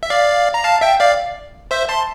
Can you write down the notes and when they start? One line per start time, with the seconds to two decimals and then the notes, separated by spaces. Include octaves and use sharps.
0.03 E5
0.10 D5 F5
0.54 A#5
0.64 F5 A5
0.81 E5 G5
1.00 D5 F5
1.71 C5 E5
1.89 A5 C6